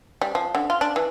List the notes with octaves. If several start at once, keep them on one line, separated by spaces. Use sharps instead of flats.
G3
F3
D3
F4
D4
E3